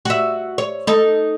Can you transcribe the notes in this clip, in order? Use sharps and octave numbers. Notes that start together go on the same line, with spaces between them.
F#4 E5
C#5
D#4 A4